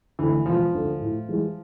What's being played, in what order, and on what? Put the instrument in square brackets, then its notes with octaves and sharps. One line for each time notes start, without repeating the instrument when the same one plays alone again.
[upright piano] D2 D3 A3 [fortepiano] E3
[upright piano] E1 [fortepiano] F3
[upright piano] D2 D3 A3
A2
E3 G#3